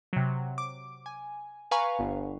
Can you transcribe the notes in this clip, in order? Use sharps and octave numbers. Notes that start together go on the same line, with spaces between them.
C3 F#3
D6
G#5
B4 F5 G#5 A#5 C#6
G1